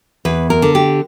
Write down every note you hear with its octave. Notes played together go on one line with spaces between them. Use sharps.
E2 B4
A#4
D3
G4